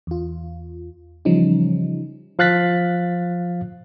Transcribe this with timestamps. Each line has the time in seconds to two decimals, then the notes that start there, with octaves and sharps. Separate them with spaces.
0.07 E2 F4
1.25 C#3 E3 F3 G3 C#4 D#4
2.39 F3 F5 F#6 A6 B6